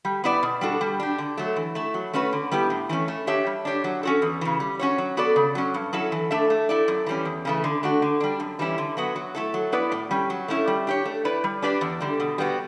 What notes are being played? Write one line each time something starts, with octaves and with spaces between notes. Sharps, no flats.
G3
B3 E4 B4 D5
B2
G3 D4 F#4 A4
G3
D4 G4
D3
F#3 A3
E3
A3 E4
F#3
A3 C#4 F#4 B4
D3
G3 B3 E4 G4
A2
E3 A3 C#4
A3
D4 G4 C#5 E5
G3
D4 G4 C#5
F#3
C#4 F#4 A4
E2
C#3 E3
G3
C#4 F#4 C#5
F#3
B3 F#4 A4 D5
C#3
F#3 C#4
G2
F#3 C#4 E4 A4
E3
A3 D4 A4 E5
A3
E4 A4 D5
F#2
E3 G3 C#4
E2
C#3 E3 A3
D3
A3 D4 F#4
D3
G3 D4
F#2
E3 G3 C#4 E4
D3
F#3 B3 F#4
F#3
A3 E4 A4
F#3
B3 E4 B4 D5
A2
G3 C#4
F#3
A3 C#4 E4
G3
D4 G4 C#5
A3
E4 B4 D5
G3
D4 G4 B4 D5
E2
D3 G3
B2
G3 B3 F#4